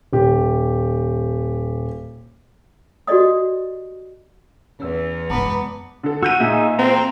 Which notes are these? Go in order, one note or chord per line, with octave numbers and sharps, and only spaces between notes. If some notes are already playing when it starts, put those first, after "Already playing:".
D#1 G4
F#4 G4 A4 D5 D#5 D#6
E2 C#4 E6
F#2 G#3 B3 A5 A#5 D6
D3 A4
F#4 E6 G6 D#7
A#2 D#4 G#4 E5
C4 A#5